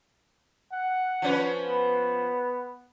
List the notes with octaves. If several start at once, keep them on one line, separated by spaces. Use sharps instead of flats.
F#5
F3 C#4 B4
B3